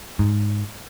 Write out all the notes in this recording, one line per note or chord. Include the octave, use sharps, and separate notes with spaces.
G#2